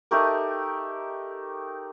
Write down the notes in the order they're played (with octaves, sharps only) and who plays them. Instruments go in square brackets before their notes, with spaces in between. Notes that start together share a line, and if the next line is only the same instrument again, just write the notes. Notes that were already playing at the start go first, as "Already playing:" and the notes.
[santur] A3 D#4 G4 A#4